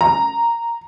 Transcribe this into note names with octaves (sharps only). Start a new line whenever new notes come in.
A#5